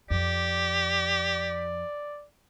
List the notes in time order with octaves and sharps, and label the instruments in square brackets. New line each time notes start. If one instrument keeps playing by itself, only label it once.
[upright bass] F2 [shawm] G4 [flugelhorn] D5